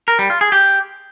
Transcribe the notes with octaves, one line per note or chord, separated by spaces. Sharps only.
A#4
G3
F4
G#4
G4